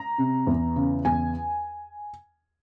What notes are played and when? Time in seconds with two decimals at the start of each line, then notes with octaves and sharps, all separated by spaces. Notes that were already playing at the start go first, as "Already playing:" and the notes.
Already playing: A#5
0.18 C3
0.47 E2
0.76 C#3
1.05 E2 G#5